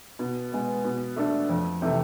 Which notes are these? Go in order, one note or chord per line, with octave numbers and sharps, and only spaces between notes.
B2
G#3 B3
B2
A3 D4 A4
F2
C3 E3 A3